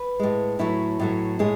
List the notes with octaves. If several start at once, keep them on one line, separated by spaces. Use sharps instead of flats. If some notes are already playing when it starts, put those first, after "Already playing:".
Already playing: B4
A2 G#3
A2 F#3 A3 E4
A2 F#3 A3
A2 G#3 G#4